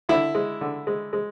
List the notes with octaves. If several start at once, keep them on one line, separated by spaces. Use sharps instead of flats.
D3 E4
G#3
D3
G#3
G#3